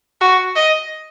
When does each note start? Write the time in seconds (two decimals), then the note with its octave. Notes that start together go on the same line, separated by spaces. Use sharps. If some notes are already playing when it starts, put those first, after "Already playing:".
0.21 F#4
0.56 D#5